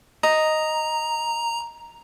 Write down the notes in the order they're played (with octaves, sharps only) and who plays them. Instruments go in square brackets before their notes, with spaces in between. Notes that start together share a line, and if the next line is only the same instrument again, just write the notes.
[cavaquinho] D#5 [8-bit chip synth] A#5